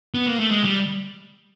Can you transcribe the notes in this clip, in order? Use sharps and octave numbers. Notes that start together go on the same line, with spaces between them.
B3
A#3
A3
G#3
G3